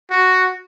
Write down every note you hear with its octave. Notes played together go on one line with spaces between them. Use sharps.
F#4